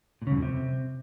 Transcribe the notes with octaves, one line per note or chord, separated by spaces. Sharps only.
A#2
C#3
F#2
F2
C3